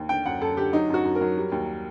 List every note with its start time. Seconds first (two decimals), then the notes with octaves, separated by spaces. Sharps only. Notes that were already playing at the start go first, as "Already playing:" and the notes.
Already playing: D#2
0.09 D3 G5
0.26 F#2 F#5
0.41 F#2 A4
0.57 D3 G4
0.73 F#3 D#4
0.89 F#2 F#4
1.05 F#2
1.15 A#4
1.21 F#3
1.37 G3
1.52 D#2